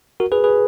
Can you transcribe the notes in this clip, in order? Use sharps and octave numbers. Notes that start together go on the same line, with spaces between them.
F#4 A#4
G#4 B4
G#4 B4